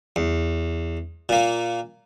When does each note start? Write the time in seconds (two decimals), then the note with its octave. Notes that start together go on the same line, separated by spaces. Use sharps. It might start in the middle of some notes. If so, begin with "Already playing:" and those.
0.16 E2
1.29 A#2 A#3